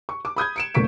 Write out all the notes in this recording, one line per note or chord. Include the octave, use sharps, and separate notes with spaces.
C#6
D6
B5 D#6 G6 G#6
C#7 D7 E7
F#1 A3 A#3 C#6 B6 D7